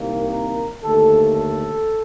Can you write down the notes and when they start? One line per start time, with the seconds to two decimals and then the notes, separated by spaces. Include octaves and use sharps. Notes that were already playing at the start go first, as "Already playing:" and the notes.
Already playing: C2 C3 D#3 A#3
0.31 A#4
0.83 D#2 D3 A3 A4
1.35 A4